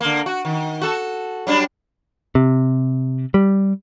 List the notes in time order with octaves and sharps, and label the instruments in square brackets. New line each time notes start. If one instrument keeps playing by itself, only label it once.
[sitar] D3 A#3
F#4
D#3
F#4 A4
F#3 G3 D4
[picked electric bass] C3
G3